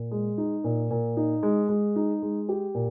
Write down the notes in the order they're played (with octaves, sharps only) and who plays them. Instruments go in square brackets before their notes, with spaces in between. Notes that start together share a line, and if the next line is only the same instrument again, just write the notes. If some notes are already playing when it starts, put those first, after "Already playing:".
Already playing: [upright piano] A#2
G#3
D#4
A#2
A#2
D#4
G#3
G#3
D#4
G#3
G4
A#2